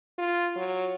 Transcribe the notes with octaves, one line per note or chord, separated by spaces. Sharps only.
F4
F#3